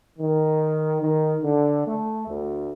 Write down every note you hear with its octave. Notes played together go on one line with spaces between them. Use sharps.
D#3
D#3
D3
A3
D2